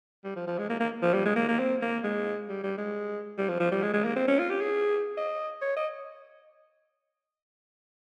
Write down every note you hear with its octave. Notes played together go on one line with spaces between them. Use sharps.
G3
F3
F3
G#3
A#3
A#3
F3
G3
G#3
A#3
A#3
C4
A#3
G#3
G3
G3
G#3
G3
F3
F3
G3
G#3
G#3
A#3
C4
C#4
F4
G4
G#4
D#5
C#5
D#5